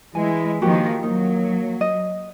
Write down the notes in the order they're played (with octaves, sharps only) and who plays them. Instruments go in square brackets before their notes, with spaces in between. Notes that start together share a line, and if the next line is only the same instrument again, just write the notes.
[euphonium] E3 [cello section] G#3 E4 [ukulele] G#5
[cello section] D#3 F3 [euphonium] A#3 [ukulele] F#4 G4
[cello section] F#3 [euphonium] A#3 [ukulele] D#4
[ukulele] D#5